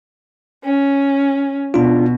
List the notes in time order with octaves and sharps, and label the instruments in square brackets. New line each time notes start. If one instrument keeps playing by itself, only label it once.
[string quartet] C#4
[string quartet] B2 [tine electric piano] D4 F4